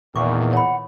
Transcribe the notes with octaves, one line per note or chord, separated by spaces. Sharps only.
E2 A#2 D#3 C#6 D6
C#5 F#5 B5